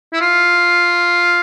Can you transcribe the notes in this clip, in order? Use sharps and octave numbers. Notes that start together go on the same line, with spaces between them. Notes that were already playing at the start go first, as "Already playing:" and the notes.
E4
F4